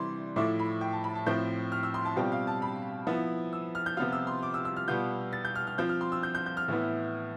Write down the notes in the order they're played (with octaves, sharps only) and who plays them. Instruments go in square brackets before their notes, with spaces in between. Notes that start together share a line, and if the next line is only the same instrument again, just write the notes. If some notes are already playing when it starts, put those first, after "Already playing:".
Already playing: [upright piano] C3 E3 G3 D5 C6
A2 F3 A3 E4 D6
B5
G5
A5
B5
A5
A2 F3 C4 E4 G6
F6
E6
C6
A5
B2 G3 C4 F4 G5
F5
A5
B5
F3 B3 E4
E6
F6
G6
C3 F3 B3 F4 F6
E6
C6
D6
E6
E6
F6
B2 G3 B3 F4 G6
A6
G6
F6
F6
F3 C4 F4 G6
F6
C6
E6
G6
G6
G6
F6
A2 E3 B3 E4